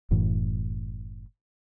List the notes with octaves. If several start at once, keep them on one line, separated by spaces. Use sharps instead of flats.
F#1 F#2 A2 E3